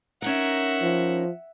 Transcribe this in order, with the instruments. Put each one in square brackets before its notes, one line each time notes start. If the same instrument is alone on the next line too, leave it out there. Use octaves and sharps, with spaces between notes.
[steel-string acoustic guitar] C#4 D#4 A#4 [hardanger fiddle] E5 F#5
[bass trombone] F3